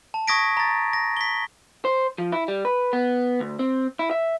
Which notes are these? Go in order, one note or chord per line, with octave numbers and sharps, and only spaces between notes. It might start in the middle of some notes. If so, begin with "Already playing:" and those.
A5
C#6 D#6 G#6 A#6 B6 D7
A#5 A6
A#6
B6 G7
C5
F3
E4
G3
B4
B3
D2
C4
E4
E5